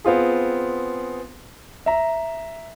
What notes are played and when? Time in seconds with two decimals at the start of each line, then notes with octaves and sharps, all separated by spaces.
0.04 B3 C4 F4 G#4
1.86 E5 A#5